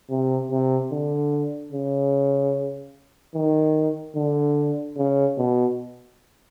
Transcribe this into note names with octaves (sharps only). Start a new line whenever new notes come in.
C3
C3
D3
C#3
D#3
D3
C#3
B2